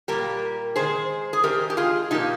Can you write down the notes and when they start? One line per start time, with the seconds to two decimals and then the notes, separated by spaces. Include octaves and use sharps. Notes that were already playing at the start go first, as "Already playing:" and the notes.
0.08 A#2 G3 A#3 G4 A#4
0.76 D#3 G#3 G#4 C5
1.33 G#4
1.43 D#3 G#3 G4 A#4
1.70 G4
1.77 F4 G#4
2.11 A#2 F3 A#3 D#4 G4